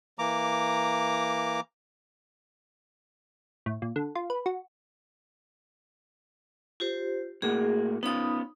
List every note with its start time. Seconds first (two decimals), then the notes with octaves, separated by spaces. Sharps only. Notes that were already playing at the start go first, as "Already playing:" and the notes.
0.19 E3 A#3 A#5 D6
3.66 A2
3.82 A#2
3.96 D3
4.15 F4
4.30 B4
4.46 F#4
6.80 F4 G4 C5
7.42 A2 A#3 F#4 G#4
8.03 B3 C#4 D#4 F4 B5 D#6